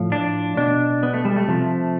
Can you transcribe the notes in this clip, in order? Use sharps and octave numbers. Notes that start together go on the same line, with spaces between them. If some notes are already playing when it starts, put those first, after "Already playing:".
Already playing: A2 F3
D4
B2 D4
B3
A3
G3
A3
C3 F3